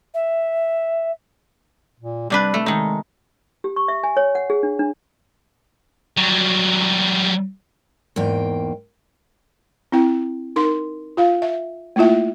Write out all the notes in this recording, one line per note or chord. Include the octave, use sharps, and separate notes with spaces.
E5
A#2
C3 G3 D4 B4
A3
D#3 G#3 D#4
G4
C#6
E5
G#5
C#5
F#5
G#4
D4
D4
F#3 G3
E2 G#2 A#3 G5
C4 E4 G5
D#4 A#4 C6
F4 F5
E5
A3 A#3 E4 F4 E5